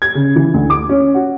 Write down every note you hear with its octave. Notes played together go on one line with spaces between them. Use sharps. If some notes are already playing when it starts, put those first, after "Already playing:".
G#6
C#3
E3
D2
D6
C#4
F#4